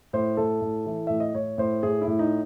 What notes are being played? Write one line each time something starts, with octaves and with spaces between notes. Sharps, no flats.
A2 C5
A2 A4
A2
E3
A2 E5
D#5
A2 C#5
A2 C5
A2 G#4
E4
A2
D#4